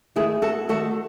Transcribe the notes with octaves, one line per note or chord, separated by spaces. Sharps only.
D#3 A3 E4 G#4
F#4 A4
D#3 A3 F#4 A4